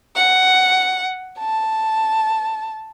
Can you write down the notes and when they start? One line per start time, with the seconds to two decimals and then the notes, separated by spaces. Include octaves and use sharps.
0.16 F#5
1.40 A5